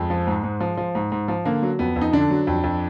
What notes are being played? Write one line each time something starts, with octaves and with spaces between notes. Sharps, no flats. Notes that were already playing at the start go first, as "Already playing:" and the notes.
Already playing: F2 G#3
F3
G#2
G#2
F3
F3
G#2
G#2
F3
D3 A#3
F#3
F2 B3
F2
D#4
D3 D4
F#3
F2
F2